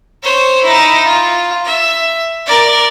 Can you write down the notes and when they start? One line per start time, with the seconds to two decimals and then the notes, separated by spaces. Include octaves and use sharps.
0.23 C5 C#5
0.64 D#4 E4
1.07 F4
1.65 E5
2.46 A#4 D5